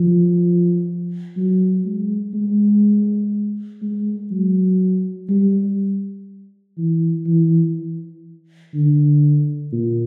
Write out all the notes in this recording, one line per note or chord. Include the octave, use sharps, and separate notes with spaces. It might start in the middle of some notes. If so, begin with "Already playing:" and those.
Already playing: F3
F#3
G#3
G#3
G#3
F#3
G3
E3
E3
D3
A#2